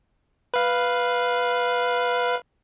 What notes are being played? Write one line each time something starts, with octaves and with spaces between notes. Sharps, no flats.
B4 F5